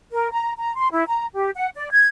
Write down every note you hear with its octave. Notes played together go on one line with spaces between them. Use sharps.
A#4
A#5
A#5
C6
E4
A#5
G4
F#5
D5
G#6